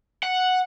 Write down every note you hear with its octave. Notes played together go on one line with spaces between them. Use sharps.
F#5